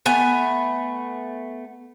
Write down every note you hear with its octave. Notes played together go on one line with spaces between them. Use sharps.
A3 B3 G#5